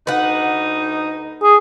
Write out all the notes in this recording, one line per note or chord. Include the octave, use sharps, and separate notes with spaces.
D2 D#4 B4 F#5
G#4